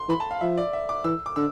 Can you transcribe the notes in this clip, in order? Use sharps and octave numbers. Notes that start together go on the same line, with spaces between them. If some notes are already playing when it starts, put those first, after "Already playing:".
Already playing: C6
E3 B5
A5
F5
F3 E5
D5
E5
D6
E3 E6
D6
D3 E6